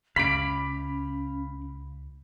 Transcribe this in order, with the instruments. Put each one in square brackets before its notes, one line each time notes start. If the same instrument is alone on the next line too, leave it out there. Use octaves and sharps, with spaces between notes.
[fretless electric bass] C#2 [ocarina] C#4 [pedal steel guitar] F5 B5 D6 [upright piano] B6 D7